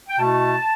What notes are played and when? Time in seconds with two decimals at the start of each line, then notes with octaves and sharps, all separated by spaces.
0.09 G5
0.18 B2 A3 E4 A5